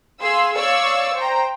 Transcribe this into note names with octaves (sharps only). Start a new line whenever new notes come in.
G#4 F5 C6 E6
C#5 D5 F5 C#6 E6
C5 G5 A#5